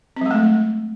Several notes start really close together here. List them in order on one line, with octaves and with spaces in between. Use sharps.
C4 F#3 G#3 A3